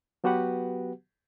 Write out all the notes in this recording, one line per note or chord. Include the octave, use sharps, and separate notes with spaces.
F#3 B3 F#4 G4 B4 F#5